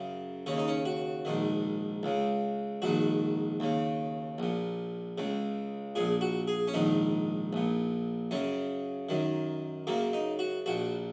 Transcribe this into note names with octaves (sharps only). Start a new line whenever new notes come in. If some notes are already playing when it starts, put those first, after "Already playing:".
Already playing: F#2 C#3
D#2 C#3 C#4
D#4
C#4
F#4
A#1 G#2 D#3
C#2 C#3
A#1 G#2 D#3 F#4
D#2 C#3
A#1 A#2
C#2 C#3
A#1 A#2 G#4
F#4
G#4
C#4
A#1 G#2 D#3 D#4
A#1 A#2
F#2 C#3 C#4
F#2 D#3
F#2 C#3 A#3
D#4
F#4
A#1 A#2 F#4